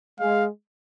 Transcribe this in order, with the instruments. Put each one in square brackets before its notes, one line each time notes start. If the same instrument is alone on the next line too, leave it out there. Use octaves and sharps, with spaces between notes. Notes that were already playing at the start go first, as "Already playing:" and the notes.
[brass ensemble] G#3 [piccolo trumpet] F5